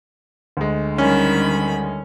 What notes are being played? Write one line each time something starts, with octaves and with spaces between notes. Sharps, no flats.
D2 G#3
D3 D#3 G3 C#4 B5